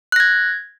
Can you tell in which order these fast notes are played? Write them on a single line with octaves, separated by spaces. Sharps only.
F#6 A#6 G#6